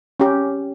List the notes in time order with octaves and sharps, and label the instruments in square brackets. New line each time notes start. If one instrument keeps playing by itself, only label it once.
[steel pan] C#4 G4